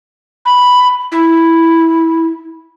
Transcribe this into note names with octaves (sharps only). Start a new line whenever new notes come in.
B5
E4